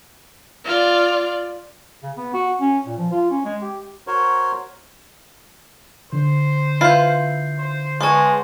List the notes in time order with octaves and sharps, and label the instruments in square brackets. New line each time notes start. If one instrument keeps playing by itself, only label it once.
[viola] F4 D5
[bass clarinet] C#3
B3
F#4
C#4
A#2
F3
F4
C#4
G#3
G4
[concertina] F#4 A#4 C5 C#5
[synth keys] D3 [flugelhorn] C5
[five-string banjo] E4 F4 B4 [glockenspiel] G6 C7
[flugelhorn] C5
[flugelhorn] G#3 [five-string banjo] B3 C#5 [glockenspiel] A5 C6